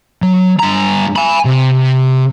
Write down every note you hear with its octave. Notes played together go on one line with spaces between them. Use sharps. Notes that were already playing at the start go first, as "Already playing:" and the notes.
F#3
G2 A#5
G#5 B5
C3